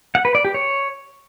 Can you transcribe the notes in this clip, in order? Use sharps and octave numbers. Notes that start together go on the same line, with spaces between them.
F#5
B4
D5
G4
C#5